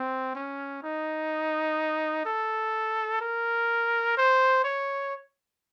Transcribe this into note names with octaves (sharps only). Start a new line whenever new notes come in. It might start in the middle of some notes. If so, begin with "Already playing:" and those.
Already playing: C4
C#4
D#4
A4
A#4
C5
C#5